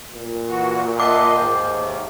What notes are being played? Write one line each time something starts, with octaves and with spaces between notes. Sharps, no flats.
A#2
E3 F#4
D#5 E5 F#5 A5 C6 D6
D#2 G#2 D#3 F5 G5
A3